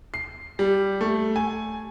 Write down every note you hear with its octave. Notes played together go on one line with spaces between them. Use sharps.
C7
G3
A3
G#5